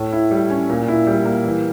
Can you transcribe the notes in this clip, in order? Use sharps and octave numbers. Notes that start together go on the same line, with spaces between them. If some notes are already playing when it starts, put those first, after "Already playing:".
Already playing: A2
E4
G3
C#4
A#2
E4
G3
A#3
E3